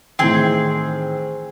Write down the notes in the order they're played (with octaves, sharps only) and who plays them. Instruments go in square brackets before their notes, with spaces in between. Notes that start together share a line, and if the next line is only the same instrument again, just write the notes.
[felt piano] A2 D#3 E3 [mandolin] C4 G#4